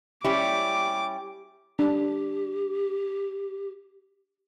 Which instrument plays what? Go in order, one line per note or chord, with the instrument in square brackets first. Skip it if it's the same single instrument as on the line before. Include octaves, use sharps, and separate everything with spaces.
[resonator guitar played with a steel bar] G3 C#4 E4 [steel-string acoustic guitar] G4 [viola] D6
[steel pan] D4 [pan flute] G4